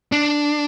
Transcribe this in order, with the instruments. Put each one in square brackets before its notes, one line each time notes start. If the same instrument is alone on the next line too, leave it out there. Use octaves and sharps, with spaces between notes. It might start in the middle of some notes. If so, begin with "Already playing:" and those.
[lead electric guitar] D4